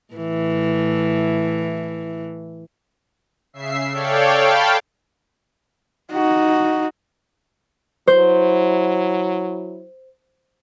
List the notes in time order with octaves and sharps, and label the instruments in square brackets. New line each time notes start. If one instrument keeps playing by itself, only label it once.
[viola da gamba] A2 E3
[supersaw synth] C#3 E5 C7
A4 C#5 D5 F5 G5
F5 G5 A5 B5
[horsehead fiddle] D#4 F#4
[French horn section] F#3 E4 [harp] C5